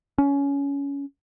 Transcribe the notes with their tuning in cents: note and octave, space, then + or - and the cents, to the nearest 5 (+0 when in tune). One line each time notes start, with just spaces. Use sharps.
C#4 +20